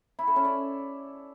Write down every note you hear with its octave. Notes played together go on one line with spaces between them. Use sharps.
E4
A4
C#4
D5